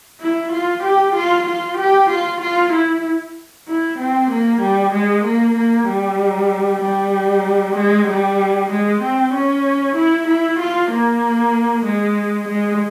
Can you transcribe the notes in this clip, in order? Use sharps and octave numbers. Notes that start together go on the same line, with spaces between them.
E4
F4
G4
F4
F4
G4
F4
F4
E4
E4
C4
A#3
G3
G#3
A#3
A#3
G3
G3
G#3
G3
G#3
C4
C#4
E4
E4
F4
A#3
G#3
G#3